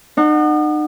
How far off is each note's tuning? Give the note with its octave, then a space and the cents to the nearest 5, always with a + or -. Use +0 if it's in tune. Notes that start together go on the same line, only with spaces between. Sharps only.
D#4 -40 F#5 +0